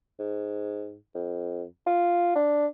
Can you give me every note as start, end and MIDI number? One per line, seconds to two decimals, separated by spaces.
0.19 0.96 44
1.15 1.64 41
1.86 2.34 65
2.35 2.66 62